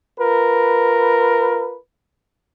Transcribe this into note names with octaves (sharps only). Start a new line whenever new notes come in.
F4 A#4 B4